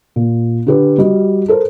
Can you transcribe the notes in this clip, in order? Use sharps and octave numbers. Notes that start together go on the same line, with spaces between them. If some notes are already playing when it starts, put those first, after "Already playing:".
A#2
D3 G4 B4
G3 F#4 D#5
A4 A#4 C5